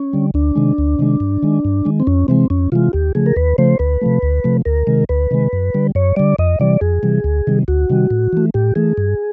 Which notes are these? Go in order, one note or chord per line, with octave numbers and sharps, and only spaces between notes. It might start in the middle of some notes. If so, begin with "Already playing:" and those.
Already playing: C#4
D3 G3
D2 D4
C3 D#3 G#3
D2
C3 D#3 G#3
G2
D#3 G#3
G2
D#3 G#3
C4
F2 C#4
C3 E3 G#3 C4
F2 C#4
C3 E3 G#3 F4
D#2 G4
C#3 F3 A3 G#4
A#4
D#2 B4
C#3 F3 A3 C5
D2 B4
C3 F3 A3
D2
C3 F3 A3
D2 A#4
C3 D#3 G#3
D2 B4
C3 D#3 G#3
F#2
D3 G3
F#2 C#5
D3 G3 D5
F2 D#5
C3 E3 G3 D5
F2 G#4
C3 E3 G3
D2
C3 D#3 G3
D2 F#4
C3 D#3 G3
A2
E3 A3
A2 G4
E3 A3 G#4
G2